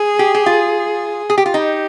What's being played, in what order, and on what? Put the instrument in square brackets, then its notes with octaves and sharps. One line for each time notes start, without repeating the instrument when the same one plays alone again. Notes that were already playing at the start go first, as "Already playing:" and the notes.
Already playing: [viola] G#4
[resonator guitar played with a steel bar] G4
G4
F4
G#4
G4
F4
[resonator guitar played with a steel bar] D#4 [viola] G4